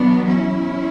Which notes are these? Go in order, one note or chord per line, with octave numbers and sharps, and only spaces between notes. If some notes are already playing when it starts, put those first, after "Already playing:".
Already playing: E2 B2 F#3 B3 D4
C#4 E4